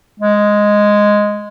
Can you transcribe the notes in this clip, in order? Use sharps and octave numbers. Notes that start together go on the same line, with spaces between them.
G#3